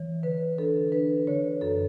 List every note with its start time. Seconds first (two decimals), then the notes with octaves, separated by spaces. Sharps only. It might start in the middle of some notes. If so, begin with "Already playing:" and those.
Already playing: E3 C#5
0.23 D3 B4
0.58 D4 A4
0.92 D4 B4
1.27 D3 C#5
1.61 F#2 A4